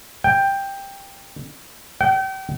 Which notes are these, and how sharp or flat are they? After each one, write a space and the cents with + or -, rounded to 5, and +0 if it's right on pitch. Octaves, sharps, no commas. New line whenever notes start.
G5 +10
G5 -35